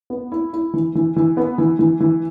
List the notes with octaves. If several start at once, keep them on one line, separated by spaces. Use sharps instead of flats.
B3
E4
E4
E3
E3
E3
B3
E3
E3
E3